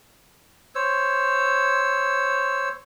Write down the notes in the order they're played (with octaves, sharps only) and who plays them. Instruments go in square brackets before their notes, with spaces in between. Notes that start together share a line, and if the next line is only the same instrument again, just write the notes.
[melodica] C5 C#5 E6